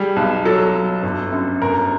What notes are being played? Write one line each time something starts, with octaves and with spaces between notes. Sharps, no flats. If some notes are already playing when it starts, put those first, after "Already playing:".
Already playing: G3 G#4
B1
F#3 A4
F#3
G1
F#2
G1 A#4